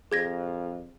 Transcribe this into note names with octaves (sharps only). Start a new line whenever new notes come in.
F2 G#4 G#6 A#6